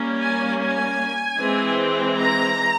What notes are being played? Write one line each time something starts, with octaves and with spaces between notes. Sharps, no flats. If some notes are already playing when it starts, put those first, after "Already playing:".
Already playing: G3 A#3 C#4
G#5
G#5
E3 G#3 C4
A#5